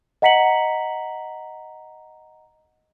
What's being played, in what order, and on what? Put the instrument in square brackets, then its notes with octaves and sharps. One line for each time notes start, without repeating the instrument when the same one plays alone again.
[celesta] D#5 F#5 A#5 B6 C#7 F#7